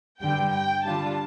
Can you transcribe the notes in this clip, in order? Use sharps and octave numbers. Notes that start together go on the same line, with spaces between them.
G2 D3 G3 G5
G5
D3 G3 D4 F4 A5